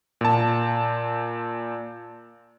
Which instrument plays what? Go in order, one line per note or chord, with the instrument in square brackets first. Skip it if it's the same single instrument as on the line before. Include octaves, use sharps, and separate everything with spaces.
[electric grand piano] A#2 A5